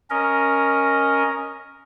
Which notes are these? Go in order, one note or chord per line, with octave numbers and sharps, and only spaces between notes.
C#4 A#4 D#5